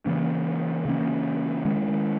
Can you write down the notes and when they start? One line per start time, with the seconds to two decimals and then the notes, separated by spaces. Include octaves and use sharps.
0.06 C#3 E3 A#3 C#4
0.85 C#3 E3 A#3 C#4
1.65 D#3 G#3 C#4